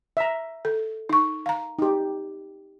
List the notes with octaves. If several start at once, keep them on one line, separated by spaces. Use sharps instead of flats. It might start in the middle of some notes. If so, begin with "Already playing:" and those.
E5 A#5
A4
D#4 C#6
F5 A#5
D#4 G4